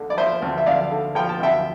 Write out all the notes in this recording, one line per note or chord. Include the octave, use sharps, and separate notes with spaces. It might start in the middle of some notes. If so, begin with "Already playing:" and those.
Already playing: D2 D3
D5
F3 C5 E5
D2
E5
D2 D5 F5
D3
F3 G5
A5
D2 E5 G5